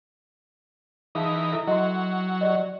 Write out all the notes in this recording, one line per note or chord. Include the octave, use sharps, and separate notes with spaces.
E3 D#4 G#4 F5 A5
E4 A4 E5
F#3 F#4 D#5
G4 D5 D#5